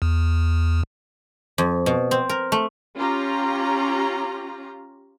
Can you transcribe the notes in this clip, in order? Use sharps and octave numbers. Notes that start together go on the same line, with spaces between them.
E2
F2
B2
C4
A#4
A3
C#4 F4 G4 A#5